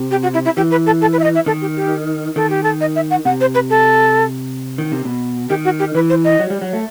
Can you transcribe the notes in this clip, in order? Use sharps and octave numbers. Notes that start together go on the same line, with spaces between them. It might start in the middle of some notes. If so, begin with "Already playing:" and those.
Already playing: C3
G4
F#4
E4
E4
E3 G4
B4
A4
A4
B4
E5
D#5
E5
D#3 A4
G4
G4
D#3 A4
G4
A4
D#5
E5
F#5
C3 F#5
C5
B4
A4
D#3
C3
B2
D#3 G4
F#4
G4
E3 B4
C5
D#5
F#3
G3
F#3
A3